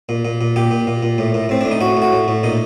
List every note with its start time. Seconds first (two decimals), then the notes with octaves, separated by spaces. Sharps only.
0.09 A#2
0.25 A#2
0.41 A#2
0.56 A#2 G4
0.71 A#2
0.87 A#2
1.03 A#2
1.18 A2
1.34 A2
1.49 A2 C4
1.61 A2 D4
1.71 D#4
1.81 A2 F#4
1.97 A2
2.02 F#4
2.12 A2
2.28 A2
2.43 A#2 D#4